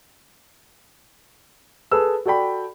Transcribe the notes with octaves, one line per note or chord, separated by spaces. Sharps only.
G#4 A4 B4 E6
F#4 A4 D5 G5 B5